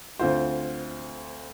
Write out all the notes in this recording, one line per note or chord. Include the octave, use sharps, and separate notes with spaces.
D2 C4 F4 C5